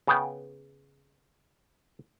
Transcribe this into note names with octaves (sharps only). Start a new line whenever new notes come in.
C#3 B3 G5